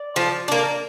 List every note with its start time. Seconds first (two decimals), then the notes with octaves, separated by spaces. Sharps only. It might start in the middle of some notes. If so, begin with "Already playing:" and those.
Already playing: D5
0.16 F3
0.48 A#3 D4